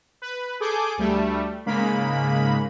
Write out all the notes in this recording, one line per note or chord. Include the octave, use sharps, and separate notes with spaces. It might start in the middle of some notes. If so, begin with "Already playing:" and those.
B4
G#4 A4 D6 G6
D2 G3 A3
G#2 C#3 G#3 A#3 B5